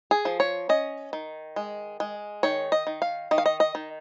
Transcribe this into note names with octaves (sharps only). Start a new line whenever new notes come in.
G#4
F3
C#5
C#4 D#5
D#3
G#3
G#3
D#3 C#5
D#5
D#3
F5
D#3 D#5
F5
D#5
D#5
D#3